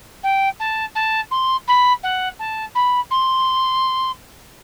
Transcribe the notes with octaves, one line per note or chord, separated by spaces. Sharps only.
G5
A5
A5
C6
B5
F#5
A5
B5
C6